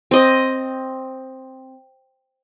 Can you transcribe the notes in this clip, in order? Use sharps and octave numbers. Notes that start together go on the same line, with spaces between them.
C4 D#5